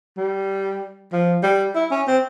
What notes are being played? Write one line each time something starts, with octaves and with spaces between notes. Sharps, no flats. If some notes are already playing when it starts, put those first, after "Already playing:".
G3
F3
G3
E4
C#4
C4